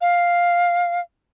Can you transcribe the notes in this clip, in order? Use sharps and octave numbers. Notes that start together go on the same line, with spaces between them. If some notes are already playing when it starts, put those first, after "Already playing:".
F5